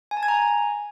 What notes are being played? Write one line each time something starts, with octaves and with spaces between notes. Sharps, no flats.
G#5
A5
G#6
A#5
G#5